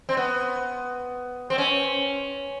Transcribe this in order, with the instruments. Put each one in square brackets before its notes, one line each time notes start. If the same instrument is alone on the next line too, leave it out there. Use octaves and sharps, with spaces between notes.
[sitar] C4
B3
C4
C#4